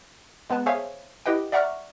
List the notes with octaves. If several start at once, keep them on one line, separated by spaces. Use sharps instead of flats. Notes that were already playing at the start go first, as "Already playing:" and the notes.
G#3 B3 B4 A5
G#4 C5 C#5 E5 F5 G#5
E4 G4 B4 D#5 F#5 G5
D5 E5 F#5 A#5 C#6 F6